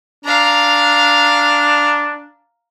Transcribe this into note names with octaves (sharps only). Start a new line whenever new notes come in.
D4 F5 A#5